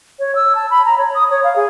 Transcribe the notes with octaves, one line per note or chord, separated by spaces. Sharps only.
C#5
E6
A5
B5
A#5
C#5
D#6
C#5
F5
G#4